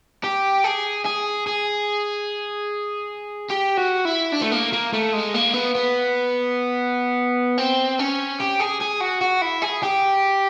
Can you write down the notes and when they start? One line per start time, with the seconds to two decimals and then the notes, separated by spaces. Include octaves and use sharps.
0.24 G4
0.64 G#4
1.05 G#4
1.47 G#4
3.50 G4
3.77 F#4
4.05 E4
4.32 D4
4.42 A3
4.52 A#3
4.73 A#3
4.94 A3
5.13 G#3
5.35 A#3
5.54 B3
5.75 B3
7.58 C4
7.99 C#4
8.40 G4
8.60 G#4
8.81 G#4
9.01 F#4
9.21 F#4
9.42 E4
9.62 G#4
9.83 G4